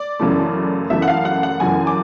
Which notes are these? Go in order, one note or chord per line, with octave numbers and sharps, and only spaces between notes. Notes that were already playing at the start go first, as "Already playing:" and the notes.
Already playing: D5
F#2 C#3 E3 A3
F#2 C#3 E3 A3 E5
F#5
F5
F#5
F#5
F#2 C#3 E3 A3 G#5
D6